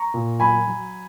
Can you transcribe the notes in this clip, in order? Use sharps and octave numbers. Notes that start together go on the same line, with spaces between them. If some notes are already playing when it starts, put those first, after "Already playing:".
Already playing: A#5 C#6
A#2
F#3 G#5 B5
F#3